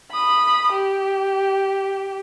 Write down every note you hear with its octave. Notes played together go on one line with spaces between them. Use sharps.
B5 D#6
G4